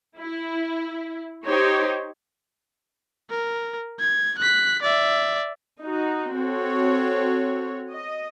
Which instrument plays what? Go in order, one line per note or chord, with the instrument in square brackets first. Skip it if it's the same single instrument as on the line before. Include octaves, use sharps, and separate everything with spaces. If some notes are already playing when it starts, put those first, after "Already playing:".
[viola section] E4
D#4 G4 C5 C#5
[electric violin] A#4
G#6
F#6 B6
D5 E5
[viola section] D#4 F#4
C4 F#4 A4 C#5
D#5